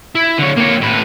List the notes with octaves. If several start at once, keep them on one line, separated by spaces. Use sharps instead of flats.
E4
D3 C#5
A#3 C#5
A2 B4